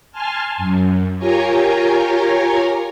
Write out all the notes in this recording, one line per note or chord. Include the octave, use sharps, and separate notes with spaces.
G#5 A5 C6 F6
F#2
F4 G4 A#4 C#5 G#5 A#5